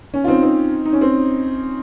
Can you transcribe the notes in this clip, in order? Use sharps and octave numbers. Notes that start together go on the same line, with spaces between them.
C#4
F4
C4 D#4
C4 D#4
D#4
C#4
C4